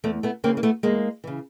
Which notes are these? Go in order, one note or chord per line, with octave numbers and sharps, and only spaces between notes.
E2 A3
A3 B3
C#3 E3 A#3 C4
A#3
A3 B3
E2 G#3 A#3
C#3 E3